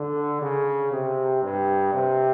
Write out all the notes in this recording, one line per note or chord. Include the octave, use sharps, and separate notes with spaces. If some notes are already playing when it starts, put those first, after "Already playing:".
Already playing: D3
C#3
C3
G2
C3